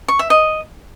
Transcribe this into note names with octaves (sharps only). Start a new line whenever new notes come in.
C#6
E5
D#5